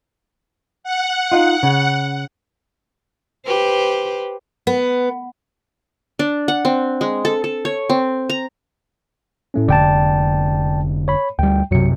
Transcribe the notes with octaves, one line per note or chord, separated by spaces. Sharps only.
F#5
D#4 F4
C#3
G4 B4 C5
B3
D4
F#5
C4
G#3
A4
A4
C#5
C4
A#5
A2 A3 C#4
F1 D3 D5 G5 A5
C#5 B5
D2 G3 G5
B1 F#2 C3 F#3 C#7